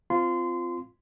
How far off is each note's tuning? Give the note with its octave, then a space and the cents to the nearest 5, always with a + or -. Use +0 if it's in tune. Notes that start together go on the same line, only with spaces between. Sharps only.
C4 -10 F4 -5 C6 -20